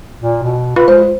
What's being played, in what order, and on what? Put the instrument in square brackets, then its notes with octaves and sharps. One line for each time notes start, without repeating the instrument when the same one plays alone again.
[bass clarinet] A#2
B2
[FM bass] F4 [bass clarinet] B4 [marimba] B5
[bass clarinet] G#3 [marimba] C5